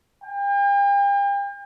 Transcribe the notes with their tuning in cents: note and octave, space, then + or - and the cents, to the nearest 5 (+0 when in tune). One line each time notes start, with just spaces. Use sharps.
G5 +40